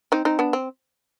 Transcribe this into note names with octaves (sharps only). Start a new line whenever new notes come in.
C4 D#4
C4 D#4
B3 D4
C4